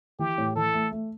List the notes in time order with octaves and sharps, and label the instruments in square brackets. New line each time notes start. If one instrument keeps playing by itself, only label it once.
[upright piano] E3 [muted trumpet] G4
[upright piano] A2
[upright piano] E3 [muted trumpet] A4
[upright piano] A3
A3